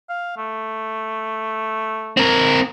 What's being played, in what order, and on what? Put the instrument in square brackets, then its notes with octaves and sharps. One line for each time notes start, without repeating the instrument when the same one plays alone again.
[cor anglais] F5
A3
[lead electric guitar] C4 A#4